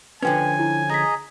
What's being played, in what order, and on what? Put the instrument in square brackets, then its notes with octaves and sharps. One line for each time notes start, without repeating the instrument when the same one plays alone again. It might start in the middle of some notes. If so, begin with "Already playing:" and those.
[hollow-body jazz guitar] D3 F3 C#4 [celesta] B4 G5 [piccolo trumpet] G#5
[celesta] E4
[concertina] G#4 D#5 A#5 [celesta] G#6 B6